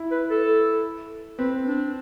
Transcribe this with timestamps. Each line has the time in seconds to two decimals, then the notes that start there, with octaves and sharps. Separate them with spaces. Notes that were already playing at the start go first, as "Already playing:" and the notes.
Already playing: E4
0.12 B4
0.30 A4
1.39 C4 B4
1.66 D4